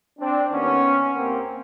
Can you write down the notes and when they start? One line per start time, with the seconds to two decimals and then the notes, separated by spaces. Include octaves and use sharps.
0.19 C4 D4
0.51 D#2 D#3 B3 C#4
1.15 D#2 D#3 A#3 C4